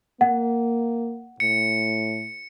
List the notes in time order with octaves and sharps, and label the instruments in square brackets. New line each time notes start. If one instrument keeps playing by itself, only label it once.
[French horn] A#3 [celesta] F#5
[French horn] A2 [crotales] C#7